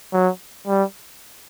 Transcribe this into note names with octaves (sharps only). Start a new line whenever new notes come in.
F#3
G3